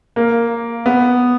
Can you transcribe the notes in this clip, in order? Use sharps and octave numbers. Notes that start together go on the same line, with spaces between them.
A#3
B3